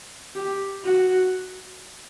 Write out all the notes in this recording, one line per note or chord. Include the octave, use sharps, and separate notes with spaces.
G4
F#4